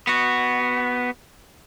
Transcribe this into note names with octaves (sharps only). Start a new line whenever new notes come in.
B3 F#4